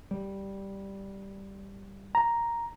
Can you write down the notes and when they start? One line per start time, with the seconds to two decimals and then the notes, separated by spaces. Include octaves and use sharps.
0.11 G3
2.15 A#5